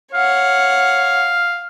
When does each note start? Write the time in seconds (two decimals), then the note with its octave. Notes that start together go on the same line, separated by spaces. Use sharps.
0.14 C#5 F5 F#5